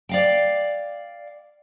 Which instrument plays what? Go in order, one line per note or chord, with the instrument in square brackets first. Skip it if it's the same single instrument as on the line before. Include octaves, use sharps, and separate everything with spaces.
[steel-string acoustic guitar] D5 F5 G5